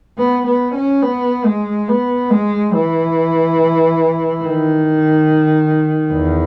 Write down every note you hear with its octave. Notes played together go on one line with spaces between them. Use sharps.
B3
B3
C#4
B3
G#3
B3
G#3
E3
D#3
E2